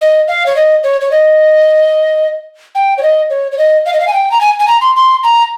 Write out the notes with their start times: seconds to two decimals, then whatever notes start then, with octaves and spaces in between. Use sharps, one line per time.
0.02 D#5
0.28 F5
0.46 C#5
0.56 D#5
0.84 C#5
1.01 C#5
1.11 D#5
2.75 G5
2.98 C#5
3.03 D#5
3.30 C#5
3.52 C#5
3.58 D#5
3.86 F5
3.93 D#5
4.00 F5
4.07 G#5
4.13 G5
4.31 A#5
4.41 G#5
4.60 G#5
4.68 A#5
4.81 C6
4.96 C6
5.24 A#5